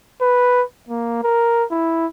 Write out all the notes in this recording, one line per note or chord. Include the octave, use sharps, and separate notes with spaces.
B4
A#3
A#4
E4